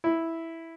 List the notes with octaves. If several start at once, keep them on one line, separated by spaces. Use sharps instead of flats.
E4